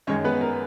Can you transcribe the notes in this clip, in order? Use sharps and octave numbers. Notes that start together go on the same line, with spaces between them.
F#2 D#3 G#3 C#4 C#5
B3 B4
A#4